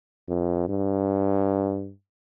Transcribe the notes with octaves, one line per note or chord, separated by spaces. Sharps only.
F2
G2